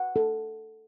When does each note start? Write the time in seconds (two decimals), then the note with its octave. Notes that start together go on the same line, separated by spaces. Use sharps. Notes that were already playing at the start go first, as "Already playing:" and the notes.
Already playing: F#5
0.16 A4